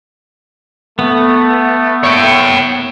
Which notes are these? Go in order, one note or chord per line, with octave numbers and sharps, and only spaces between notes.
A3 B3
C#5 G5